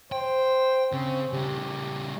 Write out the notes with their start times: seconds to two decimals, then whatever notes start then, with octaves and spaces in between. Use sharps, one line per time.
0.12 C5 G5
0.93 C#3 C4
1.33 C#3 G3 G4